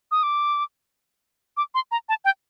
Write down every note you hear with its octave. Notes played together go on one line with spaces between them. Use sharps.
D#6
D6
D6
C6
A#5
A5
G5